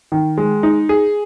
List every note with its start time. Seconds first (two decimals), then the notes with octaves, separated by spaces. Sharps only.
0.12 D#3
0.38 G#3
0.63 D#4
0.89 G#4